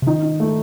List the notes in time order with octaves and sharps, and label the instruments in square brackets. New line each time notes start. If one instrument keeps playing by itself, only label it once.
[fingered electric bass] C3
[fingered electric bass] D#3 [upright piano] D#4
[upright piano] D#4
A3